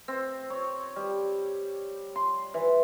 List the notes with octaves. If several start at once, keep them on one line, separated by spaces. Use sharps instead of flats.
C4
C#5
G3
C6
E3